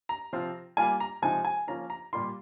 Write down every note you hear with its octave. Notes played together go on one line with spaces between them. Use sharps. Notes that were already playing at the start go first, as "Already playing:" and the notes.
A#5
C3 F3 C4 F4
G3 A#3 F4 G#5
A#5
C3 F3 G#3 D#4 G#5
G#5
F3 A#3 C#4 F4 A#5
A#5
A#2 G3 A#3 F4 C6